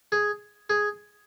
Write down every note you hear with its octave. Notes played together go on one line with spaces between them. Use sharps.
G#4
G#4